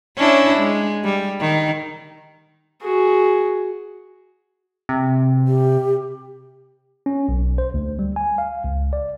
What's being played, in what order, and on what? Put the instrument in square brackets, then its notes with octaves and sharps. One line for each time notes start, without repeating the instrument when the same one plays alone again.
[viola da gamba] C#4 D4 E4
G#3
G3
D#3
[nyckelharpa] F#4 G#4
[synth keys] C3
[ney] G4
[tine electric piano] C#4
B1
C5
D2
G3
G#5
F5
C#2
D5